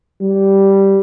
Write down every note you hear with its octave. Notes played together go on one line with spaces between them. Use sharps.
G3